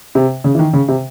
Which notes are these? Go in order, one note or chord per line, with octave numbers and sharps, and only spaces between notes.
C3
C#3
E3
D#3
C#3
C3